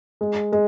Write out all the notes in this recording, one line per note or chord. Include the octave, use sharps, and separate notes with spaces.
G#3
G#3